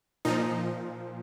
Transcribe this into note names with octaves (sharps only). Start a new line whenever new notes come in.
A#2 F3 D#4